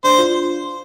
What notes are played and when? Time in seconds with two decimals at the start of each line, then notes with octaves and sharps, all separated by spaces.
0.04 D4 C5
0.18 F4